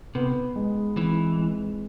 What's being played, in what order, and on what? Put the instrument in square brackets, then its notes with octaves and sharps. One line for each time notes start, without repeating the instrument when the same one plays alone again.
[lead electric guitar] C3 [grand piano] B3
[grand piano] G#3
[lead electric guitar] E3 [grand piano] C4
[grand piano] G#3